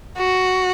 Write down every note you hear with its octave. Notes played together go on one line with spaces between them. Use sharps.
F#4